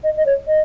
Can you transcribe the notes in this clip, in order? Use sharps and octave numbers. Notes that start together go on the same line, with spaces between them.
D#5
D#5
C#5
D#5